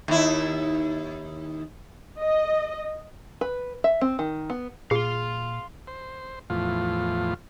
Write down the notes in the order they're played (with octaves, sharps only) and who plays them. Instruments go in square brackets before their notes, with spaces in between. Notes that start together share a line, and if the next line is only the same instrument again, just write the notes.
[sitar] D#2 E4
[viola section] D#5
[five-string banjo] B4
E5
C4
D#3
B3
[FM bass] A#2 [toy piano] G#4 [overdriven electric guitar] F5 C6
[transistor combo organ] C5
E2 A2 F3 F4